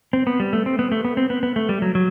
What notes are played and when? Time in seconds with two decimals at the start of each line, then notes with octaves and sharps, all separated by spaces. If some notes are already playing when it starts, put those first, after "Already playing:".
0.13 C4
0.27 B3
0.40 G3
0.53 A3
0.66 C4
0.79 B3
0.92 A3
1.05 B3
1.17 C4
1.30 B3
1.43 B3
1.56 A3
1.69 G3
1.82 F#3
1.95 F#3